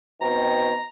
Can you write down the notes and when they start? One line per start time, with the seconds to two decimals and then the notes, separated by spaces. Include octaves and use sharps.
0.21 B2 D#3 C4 A#5